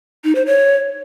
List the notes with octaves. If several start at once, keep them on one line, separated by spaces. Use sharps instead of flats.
D#4
C5
C#5